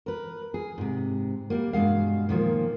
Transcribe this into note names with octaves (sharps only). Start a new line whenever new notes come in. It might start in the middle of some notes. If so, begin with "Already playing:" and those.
A#4 B4
G#4
G#2 C3
G3 A#3
G2 B2 G#3 F5
A#2 D#3 F3 A#3